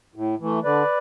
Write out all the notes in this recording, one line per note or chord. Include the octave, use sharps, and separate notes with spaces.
A2
E3 A3
D3 B4 D5